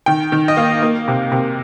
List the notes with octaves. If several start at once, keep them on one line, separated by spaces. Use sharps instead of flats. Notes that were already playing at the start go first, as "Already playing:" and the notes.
D#3 G5
D#3
D#5
A#3 F5
A#3
C3
C3